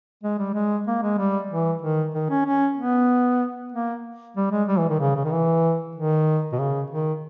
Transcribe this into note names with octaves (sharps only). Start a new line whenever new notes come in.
G#3
G3
G#3
A#3
G#3
G3
E3
D#3
D#3
C#4
C#4
B3
A#3
G3
G#3
G3
E3
D#3
C#3
C#3
D#3
E3
D#3
B2
C#3
D#3